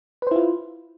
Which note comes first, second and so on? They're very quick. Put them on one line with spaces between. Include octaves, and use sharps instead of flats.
B4 C5 E4 F4